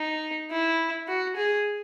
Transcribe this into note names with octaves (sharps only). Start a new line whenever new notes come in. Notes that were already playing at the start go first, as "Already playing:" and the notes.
Already playing: D#4
E4
F#4
G#4